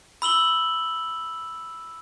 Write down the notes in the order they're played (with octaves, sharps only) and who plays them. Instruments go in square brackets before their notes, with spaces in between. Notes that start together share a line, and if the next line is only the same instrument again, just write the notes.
[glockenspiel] B5 E6 F#7 G7